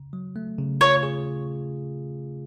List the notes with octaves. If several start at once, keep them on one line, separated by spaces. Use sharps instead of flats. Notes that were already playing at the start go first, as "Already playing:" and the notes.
Already playing: C#3
F#3
A3
C#3
F4 C#5
G#4